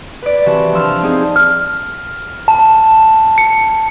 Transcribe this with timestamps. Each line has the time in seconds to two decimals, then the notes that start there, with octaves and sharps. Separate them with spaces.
0.22 B4 D5
0.46 C3 E3 F#4 A5
0.73 F3 D4 A5 C6 E6 F6
1.03 C4 D#4 G#4
1.36 F6
2.48 A5
3.38 C#7